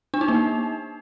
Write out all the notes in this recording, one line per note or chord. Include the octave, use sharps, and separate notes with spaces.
D4
D#4
A#3